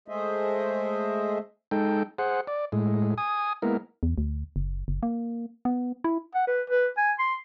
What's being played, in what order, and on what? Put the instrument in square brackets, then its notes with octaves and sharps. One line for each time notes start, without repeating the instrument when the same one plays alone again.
[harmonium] G#3 A3 G#4 C5 D#5 E5
[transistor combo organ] G#3 D#4 A4 G5
G#4 C5 F#5
D5
A2 G#3
G#5 D#6
G#3 A#3 B3 E4 A#4
[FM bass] E2
D2
F#1
F#1
A#3
B3
E4
[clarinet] F#5
B4
B4
G#5
C6